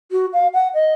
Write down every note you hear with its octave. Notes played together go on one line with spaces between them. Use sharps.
F#4
F5
F#5
D#5